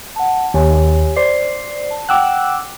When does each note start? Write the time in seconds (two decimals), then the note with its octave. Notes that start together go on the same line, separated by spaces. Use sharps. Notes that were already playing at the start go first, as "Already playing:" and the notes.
0.16 F#5 A5
0.54 D#2 G4 C#5 G#5
1.17 C5 D5 C7
1.91 A5
2.09 F#5 G5 D6 E6 F#6